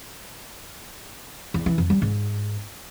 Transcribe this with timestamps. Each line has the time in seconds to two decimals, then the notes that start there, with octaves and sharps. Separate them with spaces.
1.54 E2
1.66 E3
1.78 F2
1.90 G3
2.02 G#2